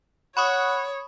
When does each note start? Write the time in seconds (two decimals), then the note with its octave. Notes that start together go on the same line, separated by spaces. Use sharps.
0.37 C#5 F#5 B5 C#6 D#6